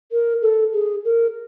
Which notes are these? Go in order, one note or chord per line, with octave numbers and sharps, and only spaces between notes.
A#4
A4
G#4
A#4